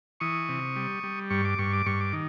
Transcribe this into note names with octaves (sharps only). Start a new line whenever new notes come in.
E3 C#6 D#6
C3
G3
G3
G2 C#6
D6
G2 C#6
D6
G2 C#6
D6
D#3